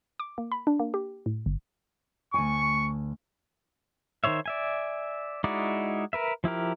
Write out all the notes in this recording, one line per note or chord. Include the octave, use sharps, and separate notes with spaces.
D6
A#3
B5
D4
A#3
G4
A2
G1
D2 G#5 C#6
D#3 F3 C5 C#5 E5
D5 E5 G#5
G#3 D#4 E4 F#4 D5
A#4 B4 E5
F3 E4 G4 A#4